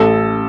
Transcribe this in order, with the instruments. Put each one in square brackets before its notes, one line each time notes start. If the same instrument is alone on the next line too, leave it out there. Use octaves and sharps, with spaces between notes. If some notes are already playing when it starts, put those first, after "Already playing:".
Already playing: [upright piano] A1 A4